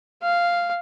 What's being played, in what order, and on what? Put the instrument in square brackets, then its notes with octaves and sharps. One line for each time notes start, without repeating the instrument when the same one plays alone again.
[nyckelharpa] F5